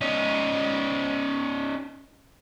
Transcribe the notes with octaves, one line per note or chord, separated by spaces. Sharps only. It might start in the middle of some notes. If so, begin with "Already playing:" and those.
C#4 D#4